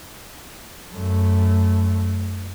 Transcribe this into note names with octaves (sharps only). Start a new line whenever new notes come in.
F#2 A3